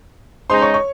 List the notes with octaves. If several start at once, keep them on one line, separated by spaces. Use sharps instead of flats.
C#3 G#3 D#4 C5 C6
C#5 C#6
C#5 C#6